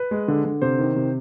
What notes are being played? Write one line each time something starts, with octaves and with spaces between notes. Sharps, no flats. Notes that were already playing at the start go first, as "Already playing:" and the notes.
Already playing: B4
G#3
D3
D3
C3 C5
D#3
C3